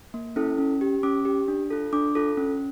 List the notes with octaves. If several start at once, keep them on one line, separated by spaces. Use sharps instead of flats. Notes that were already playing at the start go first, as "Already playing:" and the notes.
A#3
C#4 E4 A4
C#4
G4
C#4 D6
G4
D4
F4 A4
D4 D6
F4 A4
C#4